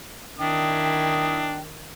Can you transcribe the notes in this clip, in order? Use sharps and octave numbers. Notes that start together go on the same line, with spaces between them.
D#3 D4 E4 E5 G5 D#6